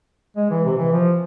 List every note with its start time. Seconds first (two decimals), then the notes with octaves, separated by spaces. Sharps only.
0.36 G#3
0.50 E3
0.64 C3
0.78 E3
0.92 F3